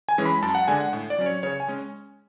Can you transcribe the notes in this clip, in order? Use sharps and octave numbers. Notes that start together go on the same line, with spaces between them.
G#5
E3 G#3 C#4
B5
F#2 A5
F#5
D3 G#3 D4 G#5
F#5
A2
D5
F#3 C#4
C#5
C#3 C#5
G#5
G#3 C#4